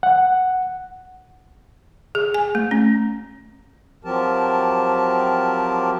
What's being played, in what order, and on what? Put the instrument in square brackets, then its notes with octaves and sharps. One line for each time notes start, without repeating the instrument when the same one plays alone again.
[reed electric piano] F#5
[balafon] G#4
G#5
A3
C#4
[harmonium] F3 F#3 C4 G4 A#4 A5